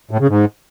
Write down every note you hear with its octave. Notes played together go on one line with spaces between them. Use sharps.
A2
C#3
G#2